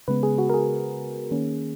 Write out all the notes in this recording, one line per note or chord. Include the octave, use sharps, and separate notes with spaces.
C#3 G#3 B3 B4
G#4
F#4
A#4
G#4
D#3 A#3 C#4